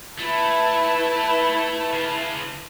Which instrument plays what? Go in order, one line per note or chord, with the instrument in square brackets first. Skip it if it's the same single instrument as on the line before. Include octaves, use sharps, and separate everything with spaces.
[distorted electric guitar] A3 [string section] E4 B4 A5
[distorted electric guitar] C#3 F4